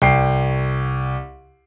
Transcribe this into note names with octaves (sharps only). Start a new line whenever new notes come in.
C2 G5 C7